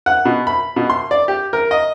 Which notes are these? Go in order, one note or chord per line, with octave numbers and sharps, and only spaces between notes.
F#5
B2
B5
B2
C6
D5
G4
A#4
D#5